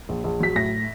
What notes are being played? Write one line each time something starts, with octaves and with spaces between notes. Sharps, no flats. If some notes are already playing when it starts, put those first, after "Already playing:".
A#1
A#1
F#3 B6
A2 A#6